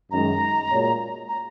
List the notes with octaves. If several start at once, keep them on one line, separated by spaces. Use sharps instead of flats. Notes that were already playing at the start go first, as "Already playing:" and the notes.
F#2 D#3 G#3 A#5
A#2 G#3 F#4 C#5
A#5